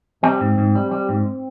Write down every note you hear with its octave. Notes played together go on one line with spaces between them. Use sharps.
G3 C4
G#2
G#2
G3
G3
G#2